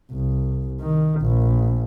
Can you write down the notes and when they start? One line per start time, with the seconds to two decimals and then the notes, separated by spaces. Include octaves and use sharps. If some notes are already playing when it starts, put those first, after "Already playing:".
0.11 C2
0.81 D#3
1.22 A#1